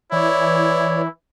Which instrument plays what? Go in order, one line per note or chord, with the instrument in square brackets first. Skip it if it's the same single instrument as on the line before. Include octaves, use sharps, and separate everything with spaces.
[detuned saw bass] E3 [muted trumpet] E4 [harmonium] C#5 D5